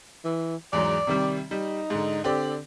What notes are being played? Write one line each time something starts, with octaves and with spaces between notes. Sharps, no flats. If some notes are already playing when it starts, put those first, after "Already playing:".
E3
E2 G#2 F#3 D5
C3 D#3 G3
G3 D#4
G#2 D3
D3 C4 G4 D5